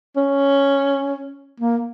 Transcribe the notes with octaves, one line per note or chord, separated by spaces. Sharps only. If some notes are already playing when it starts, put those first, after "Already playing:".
C#4
A#3